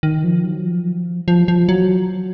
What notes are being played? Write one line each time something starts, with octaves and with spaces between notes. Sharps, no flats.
D#3
F3
F#3
F3
F3
F3
F#3